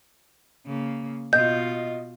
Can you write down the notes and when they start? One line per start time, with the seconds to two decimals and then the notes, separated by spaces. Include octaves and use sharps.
0.66 C#3 A#3
1.33 B2 F4 D#5 G6